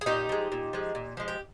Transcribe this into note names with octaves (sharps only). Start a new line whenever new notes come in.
G#4
A#2 D#4 G4
F3 G#3
A#2
F3 G#3
A#2
F3 G#3
G4